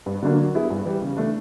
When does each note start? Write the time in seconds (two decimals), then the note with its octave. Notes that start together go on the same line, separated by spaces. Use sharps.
0.06 G2
0.23 D3 F#3 A#3 D4
0.38 F#3
0.55 B3 E4 G#4
0.70 G2
0.85 E3 G3
1.02 C#3
1.17 E3 A3 D4